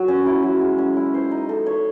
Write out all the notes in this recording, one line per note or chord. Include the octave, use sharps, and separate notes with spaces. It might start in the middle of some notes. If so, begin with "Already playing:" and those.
Already playing: F#3
C#4
E4
F#3
G#3
C#4
E4
C5
D#4
A4
C#5